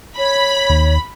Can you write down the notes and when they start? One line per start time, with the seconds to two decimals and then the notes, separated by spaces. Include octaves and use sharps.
0.17 C#5 B5
0.70 D#2